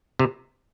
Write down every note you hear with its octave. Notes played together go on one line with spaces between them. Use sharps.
C3